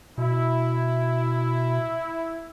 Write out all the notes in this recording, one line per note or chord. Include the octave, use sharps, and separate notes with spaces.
B2 E4